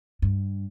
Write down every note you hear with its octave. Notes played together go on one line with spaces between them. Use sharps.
G2